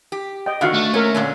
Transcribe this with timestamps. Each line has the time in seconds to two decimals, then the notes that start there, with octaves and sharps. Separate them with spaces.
0.12 G4
0.46 D#5 G5
0.61 D3 D#3 F#4 F5 F#5
0.74 A3
0.94 A#3 C#4 A#4
1.15 A#2 D3 C#4